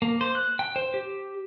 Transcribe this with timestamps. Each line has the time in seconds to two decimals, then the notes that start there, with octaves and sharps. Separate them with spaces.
0.02 A#3
0.21 C5
0.35 F#6
0.59 G5
0.76 C5
0.94 G4